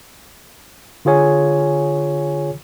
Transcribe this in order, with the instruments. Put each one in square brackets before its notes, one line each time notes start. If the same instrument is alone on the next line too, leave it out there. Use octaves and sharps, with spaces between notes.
[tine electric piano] D3 F4 G#4 C#5 G#5